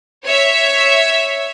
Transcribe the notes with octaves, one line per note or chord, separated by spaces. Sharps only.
C#5 E5